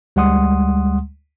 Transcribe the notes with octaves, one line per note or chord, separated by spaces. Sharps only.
D2 G3 G#3 F#5 C6 D#6